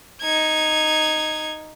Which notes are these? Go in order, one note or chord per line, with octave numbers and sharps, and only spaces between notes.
D#4 G#6